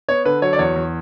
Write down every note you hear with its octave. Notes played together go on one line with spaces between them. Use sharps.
B3 C#5
D3 B4
F#3 C#5
D5
E2 C#5
E2